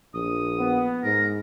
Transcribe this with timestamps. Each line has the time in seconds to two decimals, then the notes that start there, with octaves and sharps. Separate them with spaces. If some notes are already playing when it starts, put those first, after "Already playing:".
0.14 A#1 D#6
0.58 B3
1.04 G#2 A#4